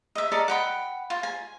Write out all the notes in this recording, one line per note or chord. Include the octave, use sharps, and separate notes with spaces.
D#5 E5
A4 A#4 D5 D#5
F#5 G5 B5
F4
G#5